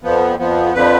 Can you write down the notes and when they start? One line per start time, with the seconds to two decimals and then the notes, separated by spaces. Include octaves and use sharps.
0.03 F2 F3 B3
0.38 F2 F3 B3
0.73 F2 D3 F3 B4